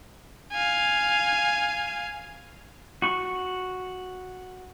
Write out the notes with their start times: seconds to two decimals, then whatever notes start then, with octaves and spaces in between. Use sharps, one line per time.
0.52 F5 G#5
3.02 F#4 C#6